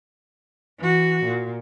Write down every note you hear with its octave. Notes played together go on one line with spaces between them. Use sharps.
E3 F#4
A#2